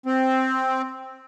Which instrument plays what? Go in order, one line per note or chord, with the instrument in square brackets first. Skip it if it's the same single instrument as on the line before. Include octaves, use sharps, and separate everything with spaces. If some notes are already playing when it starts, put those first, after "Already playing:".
[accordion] C4